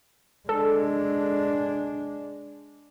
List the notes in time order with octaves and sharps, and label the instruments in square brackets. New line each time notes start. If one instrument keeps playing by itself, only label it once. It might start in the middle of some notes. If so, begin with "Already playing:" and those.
[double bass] G#3 D4 [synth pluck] A4